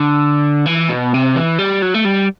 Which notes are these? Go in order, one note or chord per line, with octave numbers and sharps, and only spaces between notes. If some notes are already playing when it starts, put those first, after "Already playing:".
Already playing: D3
E3
B2
C3
E3
G3
F#3
A3
G3